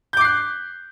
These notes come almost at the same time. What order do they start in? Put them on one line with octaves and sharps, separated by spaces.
G6 D6 C7 F#6